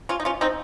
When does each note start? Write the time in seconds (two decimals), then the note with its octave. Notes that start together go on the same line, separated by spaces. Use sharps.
0.09 C#4 F4
0.20 D#4
0.25 C#4 F4
0.41 C4 D#4